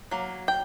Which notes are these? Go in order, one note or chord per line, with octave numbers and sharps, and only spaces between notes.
F#3 A#3
G5